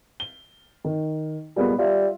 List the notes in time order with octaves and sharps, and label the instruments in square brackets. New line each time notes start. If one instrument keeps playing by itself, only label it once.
[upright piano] G7
D#3
[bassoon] A#2 [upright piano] G3 G#3 B3
[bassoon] G3 [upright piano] F4 E5